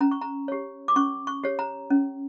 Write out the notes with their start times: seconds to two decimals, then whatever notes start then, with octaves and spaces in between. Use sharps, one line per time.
0.01 C#4 A#5
0.11 C#6
0.21 A#5
0.48 G4 C#5
0.88 D6
0.96 C#4 C#6
1.27 C#6
1.44 G4 C#5
1.59 A#5
1.90 C#4